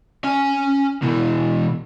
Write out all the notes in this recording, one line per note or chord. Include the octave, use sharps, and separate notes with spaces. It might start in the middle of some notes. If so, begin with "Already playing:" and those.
C#4 G#5
B2 E3